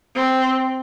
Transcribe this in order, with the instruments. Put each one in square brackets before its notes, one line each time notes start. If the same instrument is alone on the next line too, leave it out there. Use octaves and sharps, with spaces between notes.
[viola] C4